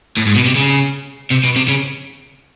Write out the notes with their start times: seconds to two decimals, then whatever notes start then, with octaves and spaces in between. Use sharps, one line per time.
0.18 A2
0.27 G#2
0.36 B2
0.46 C3
0.55 C#3
1.31 C3
1.44 B2
1.56 C3
1.68 C#3